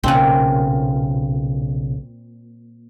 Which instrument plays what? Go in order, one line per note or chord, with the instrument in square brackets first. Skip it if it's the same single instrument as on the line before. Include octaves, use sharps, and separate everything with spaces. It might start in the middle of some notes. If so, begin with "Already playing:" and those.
[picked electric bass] B1 C#3 [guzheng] A#2 C4